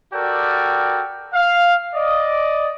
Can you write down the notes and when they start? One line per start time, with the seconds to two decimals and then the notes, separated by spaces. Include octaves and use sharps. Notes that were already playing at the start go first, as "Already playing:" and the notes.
0.13 F#4 G4 A4 A#4 D5 G5
1.33 F5
1.94 D5 D#5